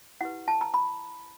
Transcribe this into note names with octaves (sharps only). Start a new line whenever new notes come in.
E4 G4 B4 F#5
A5
A#5
B5